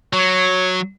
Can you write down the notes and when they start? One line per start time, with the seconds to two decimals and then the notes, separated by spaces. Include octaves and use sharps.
0.13 F#3 C#5